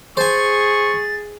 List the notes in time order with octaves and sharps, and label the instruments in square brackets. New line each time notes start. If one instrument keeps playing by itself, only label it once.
[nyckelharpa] G#4 [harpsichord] C5 G#5 [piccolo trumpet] C#6 [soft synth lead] A6